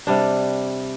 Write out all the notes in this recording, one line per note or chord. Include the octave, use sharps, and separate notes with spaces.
C3 G3 D4